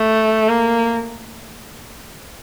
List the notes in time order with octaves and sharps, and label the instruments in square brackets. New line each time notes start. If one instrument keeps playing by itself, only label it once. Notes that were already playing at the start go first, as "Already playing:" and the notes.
Already playing: [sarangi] A3
A#3